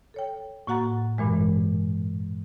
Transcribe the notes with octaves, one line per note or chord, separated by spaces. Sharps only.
A4 C#5 G5
A2 A#3 F#4 F#5 A#5 A6
G2 A#2 E3 G#3